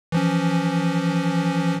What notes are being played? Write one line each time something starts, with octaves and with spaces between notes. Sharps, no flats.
E3 F3 C#4